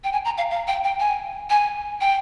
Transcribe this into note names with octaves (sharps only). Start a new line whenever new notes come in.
G5
G#5
A#5
F5
F5
G5
G5
G#5
G#5
G5